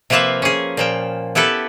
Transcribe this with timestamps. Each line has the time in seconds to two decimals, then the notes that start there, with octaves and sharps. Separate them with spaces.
0.10 C3 F3 A#3 F4 B4 E5
0.42 C#4 G#4
0.77 A#2 F3 G5
1.35 B3 E4 G4 A4 B4